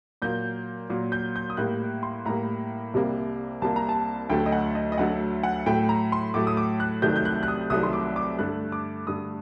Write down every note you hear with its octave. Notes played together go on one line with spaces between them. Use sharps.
A#2 F#3 A#3 G6
A#2 F#3 A#3
G6
G6
D#6
A2 G3 A#3 F#6
C6
A2 G3 A#3 A#5
C2 C3 G3 A#3
C2 C3 G3 A#3 A5
A#5
A5
D2 D3 F#3 A3 G5
D#5
F#5
D#5
D#5
D2 D3 F#3 A3 F#5
F#5
A2 F#3 A3 G5
A#5
C6
A2 F#3 A3 D6
D#6
D6
F#6
C2 C3 D#3 F#3 A3 G6
G6
F#6
F#6
D#6
C2 C3 D#3 F#3 A3 D#6
C6
D6
D6
G2 D3 A3 F#6
D6
G2 D3 A3 D#6